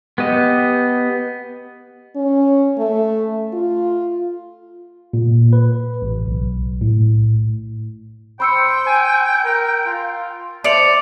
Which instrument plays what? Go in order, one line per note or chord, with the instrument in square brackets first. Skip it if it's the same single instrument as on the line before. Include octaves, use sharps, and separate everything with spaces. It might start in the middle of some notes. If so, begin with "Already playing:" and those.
[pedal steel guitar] B3 G4 D#5
[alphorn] C#4
A3
F4
[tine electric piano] A#2
B4
A1
B1
A2
[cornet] C5 [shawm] G5 [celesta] B5 E6 C#7
[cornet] G#5
A#4
F4
[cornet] C5 [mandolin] D5 [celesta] E5 C#7 F7 [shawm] A5